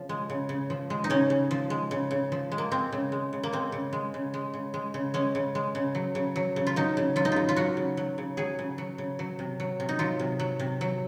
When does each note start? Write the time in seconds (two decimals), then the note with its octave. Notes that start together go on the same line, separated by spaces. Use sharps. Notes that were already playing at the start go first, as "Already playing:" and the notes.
Already playing: C#3 F3
0.09 G#3
0.30 C#3
0.49 C#3
0.70 F3
0.90 G#3
1.04 D#4
1.10 C#3 C#4
1.30 C#3
1.51 F3
1.70 G#3
1.91 C#3
2.11 C#3
2.32 F3
2.52 G#3
2.58 A#3
2.71 G#3 C4
2.92 C#3
3.12 G#3
3.33 C#3
3.43 A#3
3.53 G#3 C4
3.72 C#3
3.93 G#3
4.14 C#3
4.34 G#3
4.54 C#3
4.74 G#3
4.94 C#3
5.14 G#3 C#4
5.35 C#3
5.55 G#3
5.75 C#3
5.95 F#3
6.15 C#3
6.36 F#3
6.56 C#3
6.67 F4
6.76 F#3 D#4
6.97 C#3
7.16 F#3 F4
7.25 D#4
7.32 C#3 F4
7.49 F4
7.56 F#3 F#4
7.77 C#3
7.97 F#3
8.18 C#3
8.37 F#3 G#4
8.59 C#3
8.78 F#3
8.98 C#3
9.19 F#3
9.39 C3
9.60 F#3
9.80 C3
9.89 D#4
9.99 F#3 F4
10.19 C3
10.39 F#3
10.60 C3
10.81 F#3